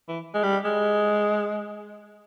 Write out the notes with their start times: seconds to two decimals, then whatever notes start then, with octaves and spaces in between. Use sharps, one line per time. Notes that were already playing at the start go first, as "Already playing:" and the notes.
0.09 E3
0.34 G#3
0.43 G3
0.64 G#3